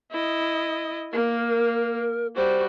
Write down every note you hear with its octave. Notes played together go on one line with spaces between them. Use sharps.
E4 D#5
A#3 A#4
G3 F#4 C5